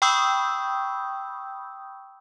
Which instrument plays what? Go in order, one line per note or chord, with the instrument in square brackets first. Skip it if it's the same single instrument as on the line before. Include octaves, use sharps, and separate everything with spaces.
[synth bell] G5 B5 C#6 D#6 E6 G6